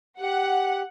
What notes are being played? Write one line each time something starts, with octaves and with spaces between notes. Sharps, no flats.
G4 F#5